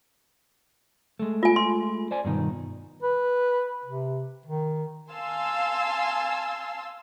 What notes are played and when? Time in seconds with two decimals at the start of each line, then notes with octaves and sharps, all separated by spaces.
1.19 G#3 A3
1.43 F4 G#5
1.56 C6
2.11 C5 D5 G#5
2.25 G2 B2 D#3
3.03 B4
3.85 C3
4.46 D#3
5.12 F5 G#5 A5 C6 E6